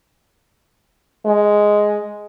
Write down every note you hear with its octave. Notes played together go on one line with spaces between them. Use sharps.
G#3